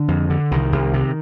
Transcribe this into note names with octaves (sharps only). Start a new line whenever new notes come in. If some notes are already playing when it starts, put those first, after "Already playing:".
Already playing: D3
F2
D3
C2 D#3
C2
C3